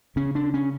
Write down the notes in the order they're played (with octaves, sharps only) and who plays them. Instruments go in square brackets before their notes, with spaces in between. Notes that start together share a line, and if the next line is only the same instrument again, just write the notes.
[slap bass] C#3 C#4
D4
C#4